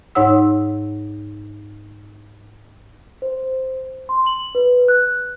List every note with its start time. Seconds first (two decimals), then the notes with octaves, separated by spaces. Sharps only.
0.15 G#2 D#4 C#5 F#5 E6
3.22 C5
4.09 C6
4.26 F#7
4.55 B4
4.88 F#6